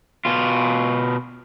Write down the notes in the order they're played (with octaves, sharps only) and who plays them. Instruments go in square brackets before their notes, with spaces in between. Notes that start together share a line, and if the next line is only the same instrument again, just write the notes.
[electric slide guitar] B2 F4